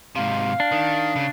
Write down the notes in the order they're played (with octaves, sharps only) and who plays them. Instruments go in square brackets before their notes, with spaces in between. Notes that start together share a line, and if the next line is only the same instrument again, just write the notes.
[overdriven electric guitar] G#2 C3 [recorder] F5
[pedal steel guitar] D4
[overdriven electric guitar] D#3
C#3